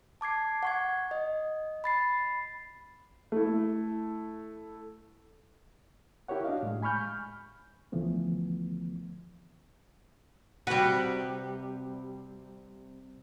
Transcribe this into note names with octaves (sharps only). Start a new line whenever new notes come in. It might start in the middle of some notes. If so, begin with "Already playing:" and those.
A5 D6 G#6 C7
F#5 C#6 G#6
D#5
B5 A6 C7
A3 E4
E4 G4 A#4 C#5 F#5
D4 F#4 D#5 F5
A2 G#3
G#5 B5 C#6 F6 G6
C#2 D3 E3 F3 A3 B3
C3 G3 F#4 B4